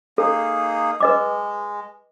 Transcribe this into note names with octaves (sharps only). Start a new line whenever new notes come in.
A#3 D#4 G#4 A4
G#3 B4 D#5 D6